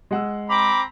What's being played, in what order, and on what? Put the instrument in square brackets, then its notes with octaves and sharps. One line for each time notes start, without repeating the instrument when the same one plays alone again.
[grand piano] G#3 F#5 E6
[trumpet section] C4 A#5 B5 [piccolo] D6